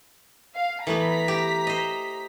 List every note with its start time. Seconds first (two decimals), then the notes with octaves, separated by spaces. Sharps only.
0.54 F5
0.87 E3 A3 B3 A#5 B6
1.28 G4
1.67 C5 D#5